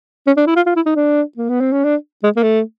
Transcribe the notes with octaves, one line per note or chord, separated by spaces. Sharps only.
C#4
D4
E4
F4
F4
E4
D#4
D4
A#3
B3
C4
C#4
D4
G#3
A#3
A3